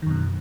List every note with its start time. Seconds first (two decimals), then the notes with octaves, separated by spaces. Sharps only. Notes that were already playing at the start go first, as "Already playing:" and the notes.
0.02 D#3
0.06 F#2
0.10 B2